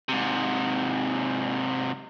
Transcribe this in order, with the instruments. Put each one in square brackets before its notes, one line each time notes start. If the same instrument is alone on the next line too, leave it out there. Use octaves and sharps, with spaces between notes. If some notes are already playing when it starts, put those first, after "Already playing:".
[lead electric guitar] G#2 C3